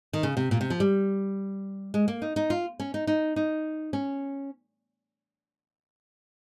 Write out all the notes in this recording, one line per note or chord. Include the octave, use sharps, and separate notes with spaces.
D#3
C#3
C3
A#2
C3
F3
G3
G#3
A#3
D#4
D#4
F4
C#4
D#4
D#4
D#4
C#4